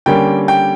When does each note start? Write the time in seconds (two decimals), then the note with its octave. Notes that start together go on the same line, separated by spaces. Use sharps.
0.06 D3 G3 A#3 C#4 G5
0.48 G5